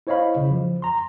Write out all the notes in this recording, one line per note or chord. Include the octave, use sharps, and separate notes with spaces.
E4 C5 C#5 D#5 F5 B5
C#3
F3
A#5 C6